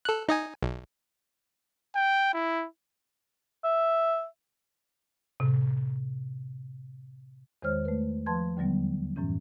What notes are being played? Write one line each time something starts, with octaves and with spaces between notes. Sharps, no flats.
A4 F#6
D#4 D#5 G#5
B1
G5
E4
E5
A2 C3
E2 D#3 G#3 C5 C#5 F6
A3 B4
F3 B4 A5 C6 G#6
D#2 D3 F#3 G3 B3
F#2 A2 E3 C#4